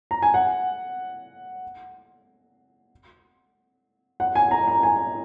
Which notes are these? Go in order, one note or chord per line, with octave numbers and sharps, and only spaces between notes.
A#5
G#5
F#5
F#5
G#5
A#5
A#5
G#5